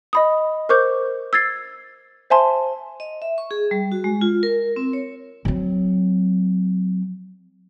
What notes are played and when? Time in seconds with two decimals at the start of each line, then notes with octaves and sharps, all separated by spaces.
0.13 D#5 B5 D#6
0.69 A#4 C5 C#6 D6 G6
1.33 E6 G#6 A6 C7
2.30 C5 E5 G#5 A5 C6
3.00 D#5
3.22 E5
3.38 C#6
3.51 G#4
3.71 G3
3.92 F#4
4.04 G#3
4.21 F4
4.43 A#4
4.76 C4
4.93 C#5
5.45 F#3 C4